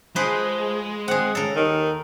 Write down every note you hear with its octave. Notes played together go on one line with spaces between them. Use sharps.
F3 G#3 G#4 B4 C5
C4 G#4 F#5
C#3 A4 A#4
D#2 D#3